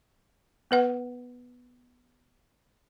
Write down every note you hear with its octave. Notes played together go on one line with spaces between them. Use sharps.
B3 B4 F#5